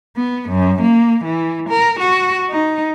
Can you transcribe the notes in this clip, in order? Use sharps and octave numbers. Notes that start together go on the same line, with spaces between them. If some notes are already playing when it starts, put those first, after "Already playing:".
B3
F#2
A#3
E3
A#4
F#4
D#4